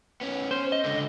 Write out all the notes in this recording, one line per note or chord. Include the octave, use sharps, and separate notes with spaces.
B3 C#4
C#4 C5
D#5
C#2 D3